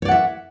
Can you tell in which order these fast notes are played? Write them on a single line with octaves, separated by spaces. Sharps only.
C#5 D5 F#5 E5